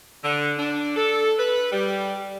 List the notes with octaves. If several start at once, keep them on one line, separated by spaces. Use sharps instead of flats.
D3
D4
A4
B4
G3